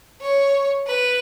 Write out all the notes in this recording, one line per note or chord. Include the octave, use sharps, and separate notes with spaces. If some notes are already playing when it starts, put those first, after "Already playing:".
C#5
B4